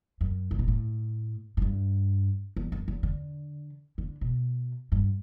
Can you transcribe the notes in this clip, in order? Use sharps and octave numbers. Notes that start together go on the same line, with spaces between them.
F#2
C#3
B2
A2
A2
G2
E2
F#2
E2
D3
D3
B2
G2